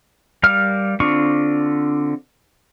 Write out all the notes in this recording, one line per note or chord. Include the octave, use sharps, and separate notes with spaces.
G3 A#4 F5 F6
D3 C4 D4 F4 C#6